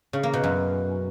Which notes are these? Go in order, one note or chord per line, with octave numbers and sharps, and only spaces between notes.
C#3
A#3
B2
F#2